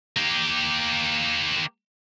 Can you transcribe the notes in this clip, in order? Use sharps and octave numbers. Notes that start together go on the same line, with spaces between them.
A#3 G4